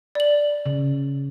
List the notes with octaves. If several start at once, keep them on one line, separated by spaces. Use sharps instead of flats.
D5 F#7
C#3